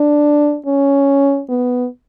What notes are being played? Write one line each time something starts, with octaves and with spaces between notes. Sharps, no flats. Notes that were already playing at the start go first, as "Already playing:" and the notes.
Already playing: D4
C#4
B3